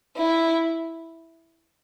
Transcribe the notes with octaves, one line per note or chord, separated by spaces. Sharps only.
E4